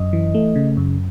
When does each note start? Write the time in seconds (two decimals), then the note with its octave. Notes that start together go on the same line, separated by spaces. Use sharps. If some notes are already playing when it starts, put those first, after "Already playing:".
Already playing: F#2 D#5
0.13 E3
0.35 A3
0.56 C#3
0.77 F#2